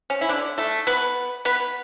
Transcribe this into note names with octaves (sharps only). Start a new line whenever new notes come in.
C#4
E4
D3 D4
A3 A4
B3 B4
B3 B4